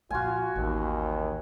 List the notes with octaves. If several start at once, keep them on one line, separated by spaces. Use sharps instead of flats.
A#2 F3 F4 F#4 G#5
A1 D#2